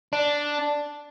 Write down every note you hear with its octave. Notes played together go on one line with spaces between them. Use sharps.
D4